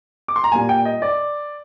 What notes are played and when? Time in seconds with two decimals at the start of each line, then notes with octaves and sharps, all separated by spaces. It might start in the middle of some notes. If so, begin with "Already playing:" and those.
0.28 D6
0.36 C6
0.44 A#5
0.52 A#2 G3 A#3 G#5
0.69 G5
0.85 D#5
1.02 D5